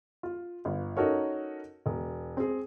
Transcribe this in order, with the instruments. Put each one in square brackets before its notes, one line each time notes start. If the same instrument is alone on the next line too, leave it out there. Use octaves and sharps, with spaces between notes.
[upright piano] F4
G1
C#4 D#4 F#4 A4 A#4 C#5
E1
C4 G#4